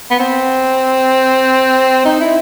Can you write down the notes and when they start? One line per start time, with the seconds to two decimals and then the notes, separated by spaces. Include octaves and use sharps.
0.10 B3
0.19 C4
2.05 D#4
2.20 E4